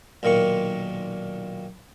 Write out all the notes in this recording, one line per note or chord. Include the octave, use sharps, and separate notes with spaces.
B1 A#2 D#3 A#3 C#6